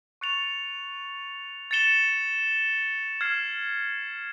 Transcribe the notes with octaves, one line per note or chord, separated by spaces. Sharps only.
C#6 F#6 A6 C#7 F7
A6 C#7 E7 G7
F6 G#6 C7